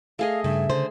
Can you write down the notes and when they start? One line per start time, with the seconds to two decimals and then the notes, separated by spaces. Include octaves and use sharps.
0.19 A3 G#4 D#5 F5
0.44 G2 C#3 E5
0.69 D3 C5